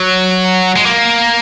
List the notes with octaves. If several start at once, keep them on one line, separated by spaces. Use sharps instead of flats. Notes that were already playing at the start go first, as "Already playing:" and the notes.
Already playing: F#3
G#3
A#3